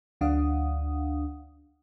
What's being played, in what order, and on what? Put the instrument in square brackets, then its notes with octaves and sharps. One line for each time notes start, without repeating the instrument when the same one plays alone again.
[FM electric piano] D2 F#3 D4 F5 F#5 D#6